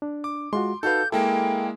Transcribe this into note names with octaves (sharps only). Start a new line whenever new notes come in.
D4
D6
G#3 F4 F#4 C6
D#4 F#4 A4 B4 F5 G6
G#3 A#3 E4 A4 G5